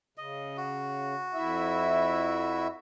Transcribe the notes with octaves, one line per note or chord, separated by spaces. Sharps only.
C#3 D#5
F#4
F2 E4 E5